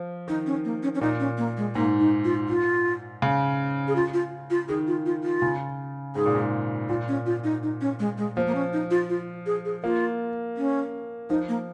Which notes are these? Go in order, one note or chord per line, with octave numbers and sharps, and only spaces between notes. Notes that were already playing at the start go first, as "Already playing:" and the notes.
Already playing: F3
D#3 D#4
C#4
A#3
C#4
C#4
A#2 D#4
C#4
A#3
G#3
G#2 A#3
D#4
F4
F4
C#3
G#4
F4
F4
F4
D#3 G#4
F4
F4
F4
C#3
G#2 G#4
A#2
G#2
A#2 F4
C#4
F4
D#4
D#4
C#4
G#3
G#3
F3 A#3
A#3
C#4
D#4
F4
F4
G#4
G#4
A#3 F4
C#4
F3 D#4
A#3